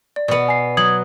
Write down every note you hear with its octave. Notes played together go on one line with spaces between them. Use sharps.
D5
B2 B3 D5
G#5 C7
F#3 D#6 G#6 F#7